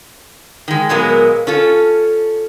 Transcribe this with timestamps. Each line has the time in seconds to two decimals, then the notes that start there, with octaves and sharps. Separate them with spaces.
0.68 D#3 G#3
0.89 A#2 F#3 G#3 A#3 B3 A#4
1.47 C#4 F4 A4